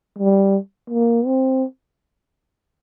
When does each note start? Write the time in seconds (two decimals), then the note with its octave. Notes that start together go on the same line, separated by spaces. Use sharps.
0.18 G3
0.90 A#3
1.26 C4